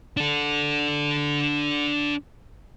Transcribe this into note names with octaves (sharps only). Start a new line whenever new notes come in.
D4 A4